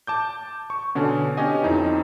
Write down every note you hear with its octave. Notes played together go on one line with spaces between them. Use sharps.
A5 D6 G6
C#6
B2 D3 C#4 D4
B3 C#4 D4 G4 D#5 G#5
F2 C4 D#4 E4